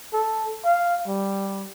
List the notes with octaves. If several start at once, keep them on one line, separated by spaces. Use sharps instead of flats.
A4
F5
G3